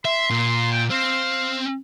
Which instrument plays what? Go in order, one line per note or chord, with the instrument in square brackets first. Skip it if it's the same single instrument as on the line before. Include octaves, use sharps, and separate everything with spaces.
[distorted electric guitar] E5 [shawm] C6
[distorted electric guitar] A#2
[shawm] G5
[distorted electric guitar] C4 [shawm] F5